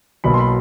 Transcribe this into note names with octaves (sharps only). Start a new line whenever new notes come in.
B1 B2 F#3 A#3 B5
C6
B5